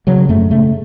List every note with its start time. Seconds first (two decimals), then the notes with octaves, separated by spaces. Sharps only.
0.07 C#3 F#3
0.29 F#2 A3
0.51 C#3 A3